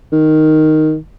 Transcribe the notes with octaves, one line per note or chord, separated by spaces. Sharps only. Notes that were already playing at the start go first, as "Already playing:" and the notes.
D#3